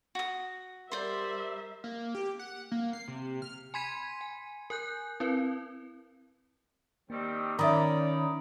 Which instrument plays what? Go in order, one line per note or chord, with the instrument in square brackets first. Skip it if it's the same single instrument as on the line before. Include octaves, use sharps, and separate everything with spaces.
[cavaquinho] F#4 D#6
[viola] G3 E5 [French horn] A#4 [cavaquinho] C5 D5 C6
[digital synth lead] A#3
G4
F#5
A#3
C7
C3
F6
[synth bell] G#5 B5 C6 G#6 B6 D#7
G#5
A#4 G#5 F#6 G6
C4 E4 A#4 B4
[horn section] D#3 G3 C4 [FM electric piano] A#3
[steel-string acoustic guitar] D#3 C#4 [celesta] A#4 E5 [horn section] D5 [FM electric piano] A#5 B5 D#6